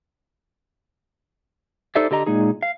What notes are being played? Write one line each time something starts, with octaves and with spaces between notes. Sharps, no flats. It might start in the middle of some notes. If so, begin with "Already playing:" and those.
D#4 G4 A4 C5 D5 E5
D3 G4 D#5 A#5
A#2 G#3 D#4 G#4
F5